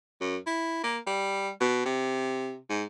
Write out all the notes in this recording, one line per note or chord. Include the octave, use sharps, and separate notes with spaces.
F#2
E4
A#3
G3
B2
C3
G#2